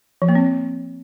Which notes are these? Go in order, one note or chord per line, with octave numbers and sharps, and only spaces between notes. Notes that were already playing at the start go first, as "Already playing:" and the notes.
F3
A#3
C4